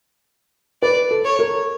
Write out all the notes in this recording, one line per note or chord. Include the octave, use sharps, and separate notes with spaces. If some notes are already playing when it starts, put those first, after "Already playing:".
B4 D5
A4
C#5
A#4